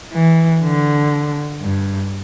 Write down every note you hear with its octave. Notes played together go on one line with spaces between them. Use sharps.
E3
D3
G2